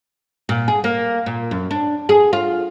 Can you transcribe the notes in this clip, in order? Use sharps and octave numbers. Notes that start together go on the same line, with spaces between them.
A#2
G#4
A#3
A#2
F#2
D4
G#4
F4